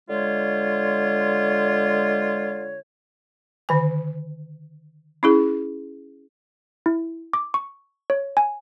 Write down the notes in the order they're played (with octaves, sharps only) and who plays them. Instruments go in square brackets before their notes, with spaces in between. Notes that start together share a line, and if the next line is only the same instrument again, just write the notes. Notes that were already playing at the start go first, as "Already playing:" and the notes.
[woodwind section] D3 G#3 F4 C#5
[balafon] D3 D#3 G#5
C#4 E4 G#4
[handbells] E4
D6
C#6
C#5
G#5